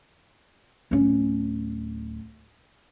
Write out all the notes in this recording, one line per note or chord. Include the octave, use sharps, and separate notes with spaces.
D1 C#4